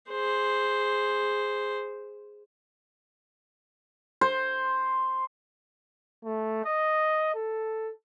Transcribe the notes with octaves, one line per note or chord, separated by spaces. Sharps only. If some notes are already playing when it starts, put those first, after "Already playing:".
G#4 C5
C5
A3
D#5
A4